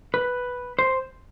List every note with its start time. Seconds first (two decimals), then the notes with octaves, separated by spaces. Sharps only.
0.14 B4
0.79 C5